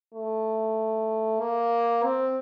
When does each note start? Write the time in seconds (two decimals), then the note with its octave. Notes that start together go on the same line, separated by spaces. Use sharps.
0.14 A3
1.41 A#3
2.04 C4